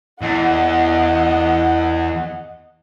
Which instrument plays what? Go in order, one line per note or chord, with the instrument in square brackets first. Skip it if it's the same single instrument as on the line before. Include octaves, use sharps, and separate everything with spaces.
[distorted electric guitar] E2 [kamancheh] D#5 F#5